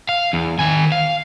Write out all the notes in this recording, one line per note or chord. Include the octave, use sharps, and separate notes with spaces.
F5
E2
D#3 G#5
F5